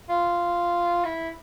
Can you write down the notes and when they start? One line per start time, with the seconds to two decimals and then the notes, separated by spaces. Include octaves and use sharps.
0.09 F4
1.04 E4